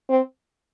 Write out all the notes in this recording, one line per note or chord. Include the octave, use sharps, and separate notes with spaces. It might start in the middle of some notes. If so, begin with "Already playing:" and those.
C4